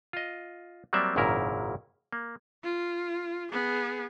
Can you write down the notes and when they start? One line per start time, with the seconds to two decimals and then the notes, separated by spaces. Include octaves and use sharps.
0.13 F4 D#5
0.93 F#3 G3 A#3 C4 D5 E5
1.16 G#1 F#2 A#2 C#3 E4 A#4
2.13 A#3
2.63 F4
3.52 B3 G#4